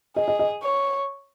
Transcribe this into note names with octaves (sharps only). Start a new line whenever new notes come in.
G#4 D#5
D#5
D#5
C#5